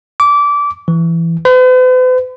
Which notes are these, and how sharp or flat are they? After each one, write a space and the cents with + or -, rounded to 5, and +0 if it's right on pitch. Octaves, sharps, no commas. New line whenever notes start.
D6 -20
E3 +15
B4 +45